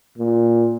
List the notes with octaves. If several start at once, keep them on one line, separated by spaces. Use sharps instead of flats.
A#2